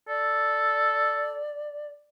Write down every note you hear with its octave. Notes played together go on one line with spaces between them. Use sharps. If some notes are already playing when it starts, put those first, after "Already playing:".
A4 D5